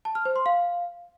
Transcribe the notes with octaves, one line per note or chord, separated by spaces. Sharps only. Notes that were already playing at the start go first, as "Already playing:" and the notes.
A5
F6
C5
C6
F5